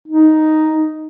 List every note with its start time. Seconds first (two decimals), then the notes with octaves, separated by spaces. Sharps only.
0.08 D#4